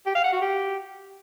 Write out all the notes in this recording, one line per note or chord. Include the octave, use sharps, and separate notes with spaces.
G4
F5
F#5
F#4
G4